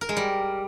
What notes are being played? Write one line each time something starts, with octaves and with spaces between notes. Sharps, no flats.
A#4
G#3
G3